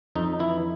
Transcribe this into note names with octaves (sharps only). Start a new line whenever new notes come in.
F2 D#4
E3 E4